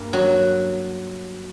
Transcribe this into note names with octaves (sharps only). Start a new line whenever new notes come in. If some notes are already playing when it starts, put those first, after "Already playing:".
Already playing: G2 A#3
F#3 F#4